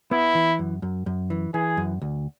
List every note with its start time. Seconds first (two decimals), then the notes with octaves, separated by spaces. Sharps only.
0.11 B3 E4
0.35 E3
0.59 F#2
0.82 F#2
1.06 F#2
1.30 E3
1.54 E3 G#4
1.77 F#2
2.01 D2